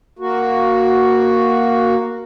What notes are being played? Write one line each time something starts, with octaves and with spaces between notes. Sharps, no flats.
A#3 F#4